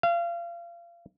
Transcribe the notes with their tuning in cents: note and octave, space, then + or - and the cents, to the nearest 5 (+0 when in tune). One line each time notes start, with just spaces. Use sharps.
F5 -30